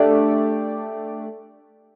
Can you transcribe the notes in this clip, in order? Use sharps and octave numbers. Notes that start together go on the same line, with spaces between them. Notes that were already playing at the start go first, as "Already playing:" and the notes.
Already playing: A3 D4 G4 D5